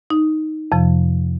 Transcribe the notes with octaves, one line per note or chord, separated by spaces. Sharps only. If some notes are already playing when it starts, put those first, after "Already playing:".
D#4
F2 C3 F3